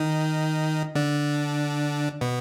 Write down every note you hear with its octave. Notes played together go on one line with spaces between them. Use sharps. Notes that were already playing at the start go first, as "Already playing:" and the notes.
Already playing: D#3 D#4
D3 D4
B2 B3